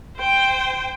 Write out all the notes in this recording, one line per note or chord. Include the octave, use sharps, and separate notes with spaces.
C5 G5